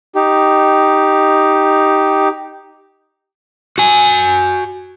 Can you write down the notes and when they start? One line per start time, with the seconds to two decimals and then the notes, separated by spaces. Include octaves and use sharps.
0.15 D#4 G4
3.78 F#4 G#5